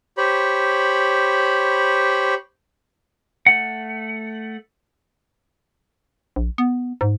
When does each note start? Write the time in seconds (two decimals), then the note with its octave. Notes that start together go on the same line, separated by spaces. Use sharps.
0.17 G4 C5 C#5 B5
3.46 A3 F#5
6.36 A#1
6.58 B3
7.01 G#2